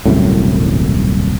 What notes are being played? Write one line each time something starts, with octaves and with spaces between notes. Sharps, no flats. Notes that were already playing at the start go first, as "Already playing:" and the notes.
D#1 C2 F#2 A2